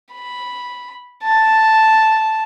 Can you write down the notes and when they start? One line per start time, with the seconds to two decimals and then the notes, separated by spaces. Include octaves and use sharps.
0.13 B5
1.24 A5